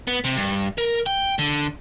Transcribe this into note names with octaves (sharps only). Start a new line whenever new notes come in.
B3
C3
G2
A#4
G5
D3